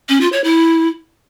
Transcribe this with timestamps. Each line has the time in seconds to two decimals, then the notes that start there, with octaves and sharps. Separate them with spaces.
0.09 C#4
0.21 F4
0.32 C#5
0.44 E4